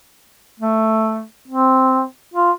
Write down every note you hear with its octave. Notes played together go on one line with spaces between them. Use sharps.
A3
C4
F4